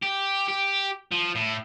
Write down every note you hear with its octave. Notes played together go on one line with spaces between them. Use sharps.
G4
G4
F3
A2